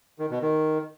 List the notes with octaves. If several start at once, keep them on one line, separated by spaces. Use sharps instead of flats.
D#3
B2
D#3